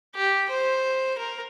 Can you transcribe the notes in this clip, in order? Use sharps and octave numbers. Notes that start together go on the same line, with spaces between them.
G4
C5
A#4